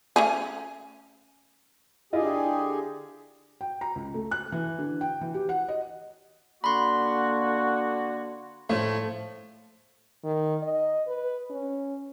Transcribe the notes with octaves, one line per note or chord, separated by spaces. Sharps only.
A3 C#4 G#4
D3 E4 F4 G4 G#4 D#5
G5
A#5
C#2
A3
F#6
E3
D3
G5
E3
G4
F#5
D#5
D3 A#3 F#4 B5 C6
A2 F3 A3
D#3
D#5
B4
C#4